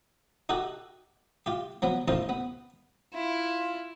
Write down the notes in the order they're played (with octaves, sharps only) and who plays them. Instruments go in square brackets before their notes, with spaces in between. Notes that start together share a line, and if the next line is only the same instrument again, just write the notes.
[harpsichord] D#4 F#4 G4 A4
F4 G4
F3 F#3 B3
A1 D#2 D#4 F4 C5
B3
[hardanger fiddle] E4 [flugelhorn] F4